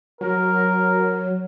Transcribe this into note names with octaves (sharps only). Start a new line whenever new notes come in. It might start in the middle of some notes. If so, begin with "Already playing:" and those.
F#3 A#4